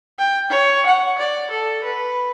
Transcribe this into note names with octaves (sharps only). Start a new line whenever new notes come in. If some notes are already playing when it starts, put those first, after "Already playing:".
G5
C#5
F#5
D5
A4
B4